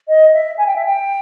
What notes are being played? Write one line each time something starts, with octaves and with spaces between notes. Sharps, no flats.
D#5
E5
G#5
G5
E5
G5